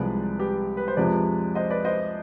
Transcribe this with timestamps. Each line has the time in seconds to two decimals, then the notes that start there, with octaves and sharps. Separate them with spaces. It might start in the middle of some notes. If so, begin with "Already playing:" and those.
Already playing: C2 C3 F3 G#3 B4 D5
0.39 G4 B4
0.77 B4
0.88 C5
0.97 F2 C3 F3 G#3 B4 D5
1.55 C5 D#5
1.70 B4 D5
1.85 C5 D#5